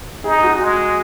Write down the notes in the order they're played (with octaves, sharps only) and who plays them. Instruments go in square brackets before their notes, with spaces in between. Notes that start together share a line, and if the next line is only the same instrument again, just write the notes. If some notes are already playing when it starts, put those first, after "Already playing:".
[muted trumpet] D#4 [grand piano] G#4
[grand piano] F#4
[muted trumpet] G#3